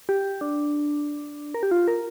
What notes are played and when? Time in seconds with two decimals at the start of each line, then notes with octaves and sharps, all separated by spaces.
0.09 G4
0.41 D4
1.54 A#4
1.63 G4
1.71 F4
1.88 A#4